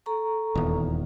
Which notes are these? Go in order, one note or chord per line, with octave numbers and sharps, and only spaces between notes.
A4 A#5 C#6
D#1 E2